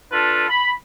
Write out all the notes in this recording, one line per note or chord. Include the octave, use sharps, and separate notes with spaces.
D4 F4 A4 B4
B5